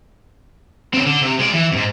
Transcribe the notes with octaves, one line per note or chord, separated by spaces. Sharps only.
C#3 C4
D3
C3
G#3 D5
E3
F2 G#2